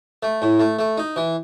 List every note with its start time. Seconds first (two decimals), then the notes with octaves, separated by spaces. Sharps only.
0.23 A3
0.42 A2
0.60 A3
0.79 A3
0.98 D#4
1.16 E3